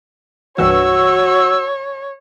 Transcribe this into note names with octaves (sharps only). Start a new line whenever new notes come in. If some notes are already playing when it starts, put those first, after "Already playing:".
C2 G2 E3 F#4 C#5 E6